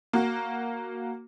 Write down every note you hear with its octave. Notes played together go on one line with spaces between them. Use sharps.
A#3 F#4